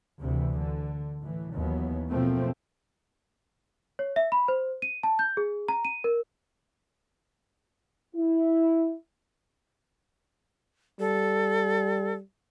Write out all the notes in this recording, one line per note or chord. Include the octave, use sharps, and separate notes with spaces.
D2 C3 E3
D3
A2 E3
D#2 E3 F#3 B3
F#2 B2 F3 A3 A#3 C4
C#5
E5
B5
C5
D#7
A5
G6
G#4
A#5
D#7
A#4
E4
G3 A4